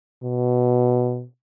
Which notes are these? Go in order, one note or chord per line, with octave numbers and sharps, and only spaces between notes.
B2